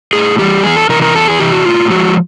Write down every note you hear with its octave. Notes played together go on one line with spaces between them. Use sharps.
A2 G#4
E3 G3 G4
E2 G#4
A4
C3 E3 A#4
A#4
E2 A4
G#4
C3 E3 G4
F#4
A2 F4
F3 G#3 F#4